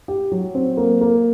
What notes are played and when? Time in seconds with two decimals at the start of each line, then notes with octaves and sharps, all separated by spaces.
0.08 G4
0.32 F#3
0.55 C4
0.77 A#3
1.01 A#3